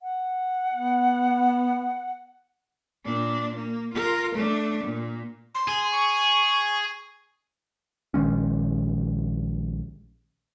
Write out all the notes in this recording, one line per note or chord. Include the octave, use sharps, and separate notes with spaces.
F#5
B3
A#2 D4
A#3
F4 A#4
A3 D4
A#2
C6
G#4
C#6
A#1 D#3 G#3 C#4